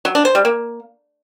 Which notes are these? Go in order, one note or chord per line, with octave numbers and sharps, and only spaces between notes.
F#3
D4
C5
G3
A#3